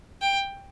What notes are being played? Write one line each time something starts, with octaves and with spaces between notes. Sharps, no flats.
G5